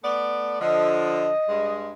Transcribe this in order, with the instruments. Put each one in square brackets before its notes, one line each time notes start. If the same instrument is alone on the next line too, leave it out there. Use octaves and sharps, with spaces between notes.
[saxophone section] A3 B3 D5
[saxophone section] D3 F3 [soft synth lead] D#5
[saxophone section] G2 G#3